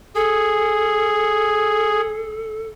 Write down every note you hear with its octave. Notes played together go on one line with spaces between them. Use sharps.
G#4 A4